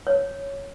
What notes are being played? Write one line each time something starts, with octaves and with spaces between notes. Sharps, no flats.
C#5